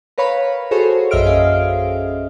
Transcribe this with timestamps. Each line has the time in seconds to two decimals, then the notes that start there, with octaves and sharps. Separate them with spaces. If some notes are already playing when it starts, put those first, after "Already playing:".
0.18 A#4 B4 C#5 F5 B5
0.71 F#4 G#4 A4 C5 C#5
1.11 A#1 F#2 D#5 E5 F6 D7
1.25 C#4 G#4 F5